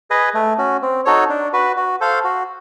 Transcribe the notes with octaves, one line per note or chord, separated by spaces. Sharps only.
G#4 B4 D#5
A3
C#4 F#4
C4
D#4 F#4 A4 C#5
D4
F#4 B4
F#4
A4 C5 F5
F#4